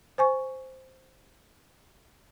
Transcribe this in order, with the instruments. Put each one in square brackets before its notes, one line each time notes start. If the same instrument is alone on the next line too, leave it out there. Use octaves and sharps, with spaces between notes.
[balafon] C5 G#5 C#6